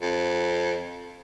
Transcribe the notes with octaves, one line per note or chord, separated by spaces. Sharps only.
F2